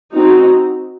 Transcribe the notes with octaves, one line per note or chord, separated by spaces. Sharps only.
C4 D#4 F#4